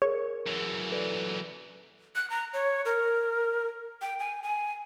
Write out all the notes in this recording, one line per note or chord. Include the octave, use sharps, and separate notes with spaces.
G#4 A#4 C#5
F#2 E3
A4 B4 D5
F#6
A#5
C#5
A#4
G5
G#5
G#5